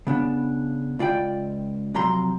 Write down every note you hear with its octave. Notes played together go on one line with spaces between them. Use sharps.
C#3 B3 D4
C#2 F4 D5 G5
F2 C3 F#3 A#5 C6